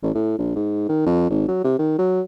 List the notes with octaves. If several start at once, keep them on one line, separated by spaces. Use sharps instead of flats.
A1
A2
A#1
G#2
D#3
F2
G#1
F#3
C3
D#3
F#3